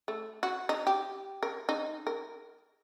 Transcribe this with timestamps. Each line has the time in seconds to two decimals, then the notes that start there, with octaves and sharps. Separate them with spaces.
0.08 A3
0.43 F#4
0.69 D#4
0.87 G4
1.43 A#4
1.69 D#4
2.07 A#4